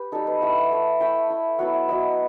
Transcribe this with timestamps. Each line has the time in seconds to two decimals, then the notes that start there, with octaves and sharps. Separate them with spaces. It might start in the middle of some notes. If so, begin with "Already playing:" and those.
Already playing: G4 B4
0.12 G3 D#4 A4
0.27 B4
0.42 A3 E4 F#5
0.71 A3 E4
1.00 A3 E4 G5
1.30 A3 E4
1.59 F#3 B3 E4 F#5
1.74 E5
1.89 F#3 B3 E4 D#5